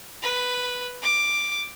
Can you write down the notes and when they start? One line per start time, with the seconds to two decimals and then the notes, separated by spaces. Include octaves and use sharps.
0.23 B4
1.03 D6